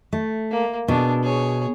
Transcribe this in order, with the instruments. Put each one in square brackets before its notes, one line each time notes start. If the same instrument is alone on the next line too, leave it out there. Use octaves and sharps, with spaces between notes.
[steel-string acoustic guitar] A3
[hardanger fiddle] A#3
[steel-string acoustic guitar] B2 [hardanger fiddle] D4 G#4
[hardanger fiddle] G#4 C#5